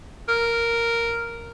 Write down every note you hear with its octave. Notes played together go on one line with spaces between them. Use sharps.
A#4